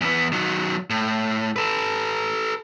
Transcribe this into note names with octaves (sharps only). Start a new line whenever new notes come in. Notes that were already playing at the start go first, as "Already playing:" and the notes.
E2 B3
D#3 F#3
A2
A4 B4